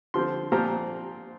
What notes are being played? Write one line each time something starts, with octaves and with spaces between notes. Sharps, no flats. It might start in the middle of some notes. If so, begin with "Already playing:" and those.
D3 F3 C4 C6
A#2 F3 C4 A#5